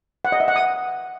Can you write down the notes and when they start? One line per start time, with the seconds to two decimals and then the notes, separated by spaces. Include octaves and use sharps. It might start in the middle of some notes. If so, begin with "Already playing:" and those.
0.25 F#5
0.32 D#5
0.40 E5
0.48 F#5
0.56 D#6